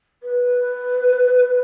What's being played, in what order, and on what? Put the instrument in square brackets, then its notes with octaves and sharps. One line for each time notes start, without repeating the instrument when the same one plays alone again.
[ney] B4